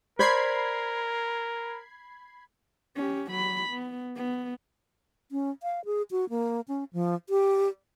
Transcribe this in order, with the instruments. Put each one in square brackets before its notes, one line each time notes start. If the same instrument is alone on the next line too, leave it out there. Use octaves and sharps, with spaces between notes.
[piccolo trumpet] A#4 [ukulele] C5 D5 [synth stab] B5 G#6 C7
[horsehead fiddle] C#4 G4
F#3 B5
B3
B3
[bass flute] C#4
F5
G#4
F#4
A#3
C#4
F3
G4